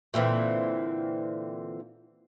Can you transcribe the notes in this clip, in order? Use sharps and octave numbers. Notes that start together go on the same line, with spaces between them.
A#2 D3 E3 C4